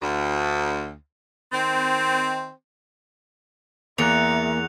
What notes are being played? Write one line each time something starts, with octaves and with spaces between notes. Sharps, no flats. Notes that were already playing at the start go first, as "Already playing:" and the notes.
D2
D#3 C4
E2 A#3 E5 A#5 F#6 C#7 F7